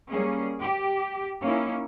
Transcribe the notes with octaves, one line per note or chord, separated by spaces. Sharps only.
G3 A#3 C#4 G#4
G4
A#3 C#4 D#4 E4